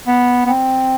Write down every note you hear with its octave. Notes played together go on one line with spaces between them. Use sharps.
B3
B3
C4